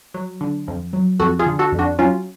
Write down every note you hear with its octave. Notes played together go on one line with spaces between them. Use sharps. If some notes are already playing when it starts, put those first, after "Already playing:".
F#3
D3
F2
F#3
F2 F#4 A4
F4 G#4
D3
F#4 A4
F2
D4 F#4
F#3 C#4 F4